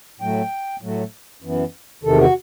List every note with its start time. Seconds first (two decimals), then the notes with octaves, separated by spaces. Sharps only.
0.20 A2 F#3 A3 G5
0.82 A2 F#3 A3
1.42 F#2 E3 B3
2.04 E2 C3 D#3 A4
2.20 F#4